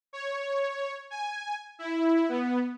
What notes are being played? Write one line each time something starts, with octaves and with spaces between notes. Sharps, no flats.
C#5
G#5
E4
B3